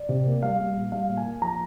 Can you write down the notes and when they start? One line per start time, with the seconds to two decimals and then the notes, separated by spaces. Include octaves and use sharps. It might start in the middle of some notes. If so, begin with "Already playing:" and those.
Already playing: D5
0.09 C3
0.27 A#3
0.43 G3 F5
0.59 G3
0.76 A#2
0.92 G3 F5
1.09 A#2
1.17 G#5
1.25 A#3
1.41 F3 A#5